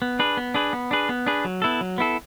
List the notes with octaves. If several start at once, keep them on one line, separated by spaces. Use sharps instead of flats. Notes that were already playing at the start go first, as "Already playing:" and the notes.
B3
D4 G#4 B4
B3
D4 G#4 B4
B3
D4 G#4 B4
B3
D4 G#4 B4
F#3
B3 E4 A4
F#3
B3 E4 A4